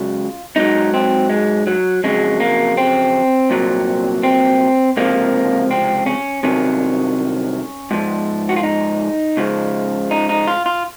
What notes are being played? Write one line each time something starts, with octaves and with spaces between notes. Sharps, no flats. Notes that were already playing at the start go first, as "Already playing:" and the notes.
Already playing: C#2 C#3 F#3 F4
G#2 F#3 D#4
C4
G#3
F#3
F2 C#3 F#3 G#3
A#3
C4
C2 A#2 F#3
C4
C#2 C3 F3 A#3
C4
C#4
C2 C3 D#3 F#3 C#4
G#2 F3
F#4
F4
D#4
C#2 C#3 F3
D#4
D#4
F4
F4